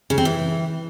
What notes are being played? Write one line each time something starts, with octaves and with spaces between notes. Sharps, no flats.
C#3
C4
E3